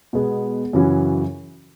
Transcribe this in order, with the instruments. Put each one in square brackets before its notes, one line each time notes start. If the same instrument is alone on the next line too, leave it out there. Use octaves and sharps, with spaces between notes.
[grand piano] B2 G#3 B3 G#4
F#2 C#3 E3 C#4 F#4